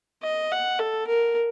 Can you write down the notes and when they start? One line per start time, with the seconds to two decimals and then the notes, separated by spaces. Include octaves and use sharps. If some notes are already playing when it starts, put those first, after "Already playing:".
0.23 D#5
0.52 F#5
0.79 A4
1.08 A#4